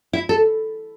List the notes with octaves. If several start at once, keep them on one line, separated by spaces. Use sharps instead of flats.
E4
A4